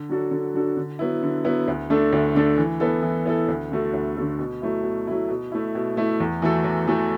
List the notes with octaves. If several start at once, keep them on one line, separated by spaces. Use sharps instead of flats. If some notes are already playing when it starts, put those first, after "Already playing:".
Already playing: D3
F#3 D4 F#4 A4
D3
F#3 D4 F#4 A4
D3
F#3 B3 E4
D3
F#3 B3 E4
D2
D3 A3 D4 A4
D2
D3 A3 D4 A4
E3
B3 E4 A4
E3
B3 E4 A4
D2
D3 A3 F#4 A4
D2
D3 A3 F#4 A4
B2
F#3 A3 E4
B2
F#3 A3 E4
B2
A3 E4
B2
A3 E4
E2
E3 A3 F#4 A4
E2
E3 A3 F#4 A4